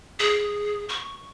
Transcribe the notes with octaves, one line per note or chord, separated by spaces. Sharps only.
G#4
C#6